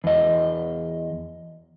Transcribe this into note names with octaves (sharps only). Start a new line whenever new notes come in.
E2 D#5